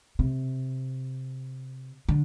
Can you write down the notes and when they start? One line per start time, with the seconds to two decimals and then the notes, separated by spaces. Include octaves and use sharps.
0.19 C3
2.09 D3